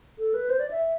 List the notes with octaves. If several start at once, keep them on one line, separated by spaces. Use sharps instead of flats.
A4
B4
C5
D5
E5